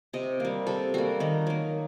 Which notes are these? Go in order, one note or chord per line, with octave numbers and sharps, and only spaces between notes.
C3 D#5
G3 A#3
C3 A4
G3 A#3 F#4
D#3 D#4
F#3 A#3